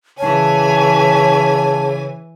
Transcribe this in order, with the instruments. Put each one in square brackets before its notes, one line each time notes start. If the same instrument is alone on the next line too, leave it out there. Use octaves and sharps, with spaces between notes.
[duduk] C#3 [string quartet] E3 G#5 [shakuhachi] C#5 [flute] A5